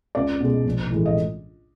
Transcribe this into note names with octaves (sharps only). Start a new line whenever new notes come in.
C#2 D5
B2 G#3
A#1
A2 E3 G#3
D#5